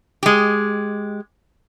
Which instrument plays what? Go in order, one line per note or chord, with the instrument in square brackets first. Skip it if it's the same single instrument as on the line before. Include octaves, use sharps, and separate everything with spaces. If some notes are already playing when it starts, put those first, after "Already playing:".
[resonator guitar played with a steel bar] G#3 G4